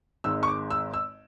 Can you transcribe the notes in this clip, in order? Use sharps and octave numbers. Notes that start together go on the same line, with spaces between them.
G#1 G#2 G#3 E6
C#6
D6
E6
E6